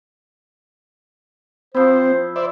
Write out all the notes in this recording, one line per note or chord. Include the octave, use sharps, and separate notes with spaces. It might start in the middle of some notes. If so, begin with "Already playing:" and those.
F3 C4 E4 C5
C5 D5 E5